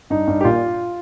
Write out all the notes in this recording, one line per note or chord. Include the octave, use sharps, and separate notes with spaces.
G2 D#4
G2
G4
A#2 F4